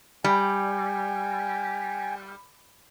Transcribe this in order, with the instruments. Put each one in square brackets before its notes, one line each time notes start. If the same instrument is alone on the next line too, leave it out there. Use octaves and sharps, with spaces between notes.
[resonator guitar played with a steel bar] G3 [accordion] G5 G#5